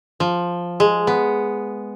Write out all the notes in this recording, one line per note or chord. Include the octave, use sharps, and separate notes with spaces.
F3
G#3
B3